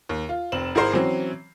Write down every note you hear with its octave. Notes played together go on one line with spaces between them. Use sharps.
D#2
F4
F1 C4 E7 F#7
G#1 E4 G#4 A#4 C5 C7
E3 F#3 C4 C#4